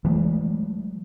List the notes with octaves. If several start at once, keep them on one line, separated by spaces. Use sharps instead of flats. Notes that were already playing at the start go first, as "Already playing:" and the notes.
E3 F#3 G#3 A3